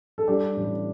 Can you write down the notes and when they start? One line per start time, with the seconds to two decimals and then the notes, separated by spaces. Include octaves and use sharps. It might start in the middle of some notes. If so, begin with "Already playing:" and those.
0.18 A4
0.27 G3 D4 G4
0.57 A1